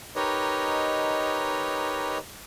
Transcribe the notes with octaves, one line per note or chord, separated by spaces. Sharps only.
D#4 G4 A#4 B4 C#5 D#5